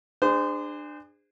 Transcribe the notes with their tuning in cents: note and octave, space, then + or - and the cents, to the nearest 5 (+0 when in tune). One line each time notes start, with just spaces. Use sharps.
D4 +25 G#4 -30 C5 -25